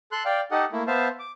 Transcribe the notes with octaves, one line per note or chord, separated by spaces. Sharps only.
A4 C6 F#6
D5 F5 G5
D#4 G4 A4 D#5 F#5
A3 A#3 E4
B3 C5 E5 F5 A5
D6